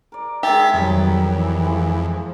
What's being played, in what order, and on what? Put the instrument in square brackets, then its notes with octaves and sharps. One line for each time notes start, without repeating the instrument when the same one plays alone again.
[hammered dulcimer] A#4 D5
[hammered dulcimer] D#3 G#3 G#4 [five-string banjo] G4 [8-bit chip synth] E5 A6 B6
[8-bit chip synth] F2 [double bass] D#3 F#3 [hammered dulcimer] G3
[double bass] E3
[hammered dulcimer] F3 G#3